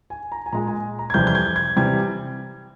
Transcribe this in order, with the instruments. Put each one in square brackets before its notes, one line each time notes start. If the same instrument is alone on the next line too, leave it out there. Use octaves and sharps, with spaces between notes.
[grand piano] G#5
A#5
G#5
A#2 G#3 A#5
G#5
A#5
G#6
F2 C3 E3 G3 G6
G6
G#6
G#6
C3 E3 G3 G#6